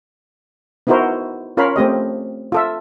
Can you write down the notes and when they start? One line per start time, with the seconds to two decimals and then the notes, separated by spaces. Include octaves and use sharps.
0.87 B3 D#4 E4 F#4 A#4 C5
1.57 C#4 F4 A#4 C#5 F5 B5
1.76 A3 C4 G4 D#5
2.52 F4 A4 E5